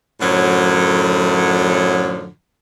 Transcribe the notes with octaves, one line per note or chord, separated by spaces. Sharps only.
F#2 A2 D3 F3 F#3